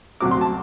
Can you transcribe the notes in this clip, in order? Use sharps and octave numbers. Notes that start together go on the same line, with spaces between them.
D2 C3 F#3 C4 D6
C6
A5